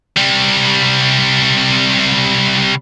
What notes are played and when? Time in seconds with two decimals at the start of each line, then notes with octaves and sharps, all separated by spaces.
0.17 C3 G3